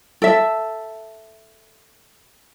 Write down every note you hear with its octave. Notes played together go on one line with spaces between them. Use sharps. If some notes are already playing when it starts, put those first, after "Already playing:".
A4 E5